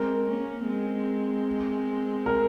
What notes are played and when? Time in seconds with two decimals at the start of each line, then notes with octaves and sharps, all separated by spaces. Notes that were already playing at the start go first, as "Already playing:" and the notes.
Already playing: G#3 C4 A#4
0.28 A#3 C#4
0.67 G#3 C4
2.26 A#4